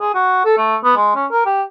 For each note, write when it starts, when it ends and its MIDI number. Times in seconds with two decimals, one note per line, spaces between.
0.01 0.14 68
0.15 0.43 66
0.45 0.58 69
0.58 0.76 57
0.84 0.93 59
0.97 1.10 56
1.15 1.26 61
1.31 1.43 70
1.46 1.62 67